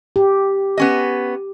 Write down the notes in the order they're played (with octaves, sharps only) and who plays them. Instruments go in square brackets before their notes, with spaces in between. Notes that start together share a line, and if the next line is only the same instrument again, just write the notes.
[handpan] G4
[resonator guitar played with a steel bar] B3 C#4 D#5